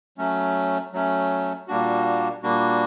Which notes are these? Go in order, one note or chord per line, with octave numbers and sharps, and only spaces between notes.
F#3 A3 C#4
F#3 A3 C#4
A#2 G3 A#3 D4 F#4
A#2 G3 A#3 D4 F#4